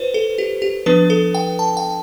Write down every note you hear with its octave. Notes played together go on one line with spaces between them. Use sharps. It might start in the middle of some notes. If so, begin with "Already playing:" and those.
Already playing: F4 B4 C5
A4
G4
G4
F3 B3 D4 B4
A4
G5
A5
G5